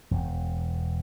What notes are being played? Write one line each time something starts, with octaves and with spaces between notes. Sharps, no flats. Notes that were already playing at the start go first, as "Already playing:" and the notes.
E1